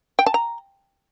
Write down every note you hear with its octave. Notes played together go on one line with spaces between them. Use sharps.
G5
A5
A#5